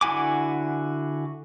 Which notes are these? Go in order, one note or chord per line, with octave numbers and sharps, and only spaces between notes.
D3 E4 F#4 G#5 D6